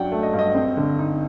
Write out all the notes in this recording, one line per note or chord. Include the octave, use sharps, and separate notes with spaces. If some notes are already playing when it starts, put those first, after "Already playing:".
Already playing: G2 F#3 D4 F#5 G5
A3
D#5
G2
D#5
C4
D3
D#4